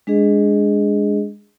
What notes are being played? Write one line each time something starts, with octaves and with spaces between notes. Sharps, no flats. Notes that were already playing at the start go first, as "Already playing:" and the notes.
G#3 D4 G#4 D#5